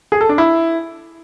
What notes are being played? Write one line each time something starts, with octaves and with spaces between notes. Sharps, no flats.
G#4
A4
D4
E4